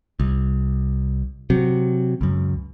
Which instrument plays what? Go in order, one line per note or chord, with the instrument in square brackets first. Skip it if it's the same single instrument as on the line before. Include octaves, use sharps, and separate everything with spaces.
[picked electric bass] C2
C3 F#3
C#2 F#2